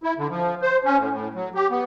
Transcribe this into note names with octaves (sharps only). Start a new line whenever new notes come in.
E4
D3
F3
C5
C#4
A2
A2
F#3
G4
B3